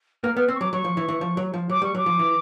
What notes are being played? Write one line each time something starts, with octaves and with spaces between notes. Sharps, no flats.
A#3 F6
B3 F6
C4 E6
C#6
F#3 D6
F#3 C#6
F3
E3
E3
F3
F#3
F3
F#3 D6
G3 C#6
F#3 D6
F3
E3